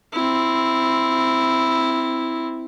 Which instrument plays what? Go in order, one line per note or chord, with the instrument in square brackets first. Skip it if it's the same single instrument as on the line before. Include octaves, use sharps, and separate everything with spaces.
[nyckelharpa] C4 E4